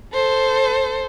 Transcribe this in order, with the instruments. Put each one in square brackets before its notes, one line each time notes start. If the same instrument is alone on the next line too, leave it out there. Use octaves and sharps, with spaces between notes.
[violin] A4 C5